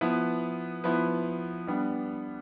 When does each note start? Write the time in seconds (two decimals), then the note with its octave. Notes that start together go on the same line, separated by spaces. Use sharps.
0.01 F3 B3 E4 B4
0.84 F3 B3 E4 B4
1.67 G3 B3 D4